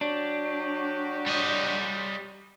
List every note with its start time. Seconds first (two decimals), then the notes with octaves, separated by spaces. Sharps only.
0.01 F#3 D4 F#4 G4
1.26 G3 D#5